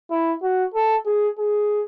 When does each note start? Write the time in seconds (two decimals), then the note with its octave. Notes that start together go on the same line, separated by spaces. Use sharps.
0.10 E4
0.42 F#4
0.74 A4
1.06 G#4
1.38 G#4